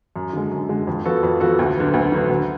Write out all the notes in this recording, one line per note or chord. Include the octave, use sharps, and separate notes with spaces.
F#2
D3 G#3
F#2
D3 G#3
F2
F3 B3 F#4 A4
F2
F3 B3 F#4 A4
D2
D3 F#3 B3
D2
D3 F#3 B3
D2